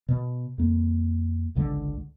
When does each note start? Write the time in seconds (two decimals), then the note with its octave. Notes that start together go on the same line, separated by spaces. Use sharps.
0.09 B2
0.58 F2 A#3
1.55 G#1 C#2 D3 G#3